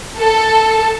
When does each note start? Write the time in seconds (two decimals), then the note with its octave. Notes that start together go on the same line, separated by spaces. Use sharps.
0.18 A4